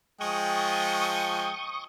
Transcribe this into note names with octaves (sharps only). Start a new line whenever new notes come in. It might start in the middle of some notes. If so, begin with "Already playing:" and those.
F3 G#3 G5 C#6 D#6